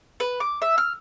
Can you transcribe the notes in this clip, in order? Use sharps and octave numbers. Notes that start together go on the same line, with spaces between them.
B4
D6
E5
F6